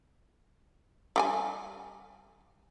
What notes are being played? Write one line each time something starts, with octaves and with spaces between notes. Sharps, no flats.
G3 G5 G#5